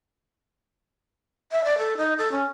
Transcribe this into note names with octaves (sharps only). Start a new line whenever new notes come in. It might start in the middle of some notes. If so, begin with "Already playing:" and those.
E5
D5
A4
D#4
A4
C#4